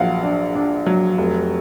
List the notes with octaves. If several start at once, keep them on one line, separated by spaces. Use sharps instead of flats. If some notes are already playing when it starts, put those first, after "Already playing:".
Already playing: A#1 F#3 F5 F#5
D4
D4
F#3
F1